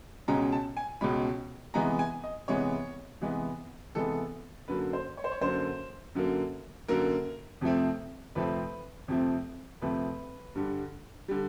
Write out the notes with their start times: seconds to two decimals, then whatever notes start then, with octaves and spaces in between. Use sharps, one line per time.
0.28 C#2 B2 G#3 C#4 A#5
0.52 A5
0.77 G#5
1.01 C#2 B2 G#3 C#4 B5
1.74 C3 E3 G#3 B3 A#5
1.99 G#5
2.24 D#5
2.48 C3 E3 G#3 B3 C#5
3.21 C3 E3 G#3 B3
3.95 C3 E3 G#3 B3 A4
4.68 F#2 D3 F#3 A#3 B4
4.93 C5
5.17 C#5
5.24 C5
5.32 C#5
5.41 F#2 D3 F#3 A#3 C5
6.15 F#2 D3 F#3 A#3
6.88 F#2 D3 F#3 A#3 A#4
7.61 F2 C3 F3 A3 C4
8.35 F2 C3 F3 A3 C4 B4
9.08 F2 C3 F3 A3 C4
9.82 F2 C3 F3 A3 C4 B4
10.55 G2 D3 G3
11.28 D3 G3